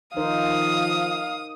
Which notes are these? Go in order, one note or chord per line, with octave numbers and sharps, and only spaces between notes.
D#3 F3 D#4 A#4 C5 F5 D#6